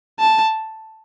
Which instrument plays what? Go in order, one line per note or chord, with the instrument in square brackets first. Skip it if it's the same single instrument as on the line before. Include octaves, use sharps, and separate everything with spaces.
[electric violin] A5